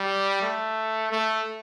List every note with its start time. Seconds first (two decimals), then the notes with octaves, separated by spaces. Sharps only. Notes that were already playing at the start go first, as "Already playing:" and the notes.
Already playing: G3
0.42 A3
1.12 A3